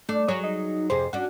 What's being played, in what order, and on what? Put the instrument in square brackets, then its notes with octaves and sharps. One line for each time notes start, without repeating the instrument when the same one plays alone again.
[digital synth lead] A3 [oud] D4
[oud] F#3 G#4 A#4 [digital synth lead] C#5
[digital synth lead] D#4
[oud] F2 C3 G#4 [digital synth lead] C5
[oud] C#4 D4 [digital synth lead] F#4